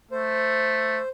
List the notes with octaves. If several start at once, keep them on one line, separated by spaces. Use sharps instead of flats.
A3 C5